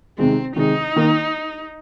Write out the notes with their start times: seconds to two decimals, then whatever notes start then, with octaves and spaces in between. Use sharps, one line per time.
0.18 C3 D#3 G#3 C4
0.56 C3 D#3 G#3 D#4
0.96 D#3 A#3